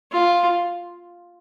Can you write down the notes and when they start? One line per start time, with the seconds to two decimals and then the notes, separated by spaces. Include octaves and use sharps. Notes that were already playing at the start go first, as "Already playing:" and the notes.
0.12 F4